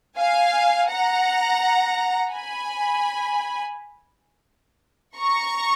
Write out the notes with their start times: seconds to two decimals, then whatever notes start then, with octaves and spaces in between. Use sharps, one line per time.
0.18 F5 G#5
0.90 F#5 A#5
2.32 G#5 B5
5.17 A#5 C#6